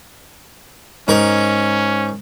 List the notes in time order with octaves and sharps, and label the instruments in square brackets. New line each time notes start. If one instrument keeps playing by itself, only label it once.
[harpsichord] G#2 A#4 A#5 [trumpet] C#4